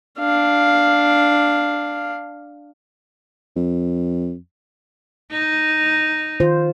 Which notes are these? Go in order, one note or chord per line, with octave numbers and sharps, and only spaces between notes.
D4 F5
F2
D#4
D#3 F4 C5